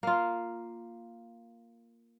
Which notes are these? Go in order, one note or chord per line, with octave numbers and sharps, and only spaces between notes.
A#3 F4